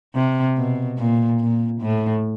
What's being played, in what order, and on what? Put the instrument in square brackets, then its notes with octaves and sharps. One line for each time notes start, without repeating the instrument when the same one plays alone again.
[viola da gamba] C3
B2
A#2
A#2
A2